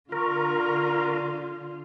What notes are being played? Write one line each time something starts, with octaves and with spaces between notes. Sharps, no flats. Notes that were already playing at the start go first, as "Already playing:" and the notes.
D3 F4 A#4 A#5 C#6